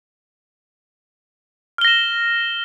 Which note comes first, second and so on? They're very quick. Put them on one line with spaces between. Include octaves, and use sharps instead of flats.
F6 G7 A#6 E7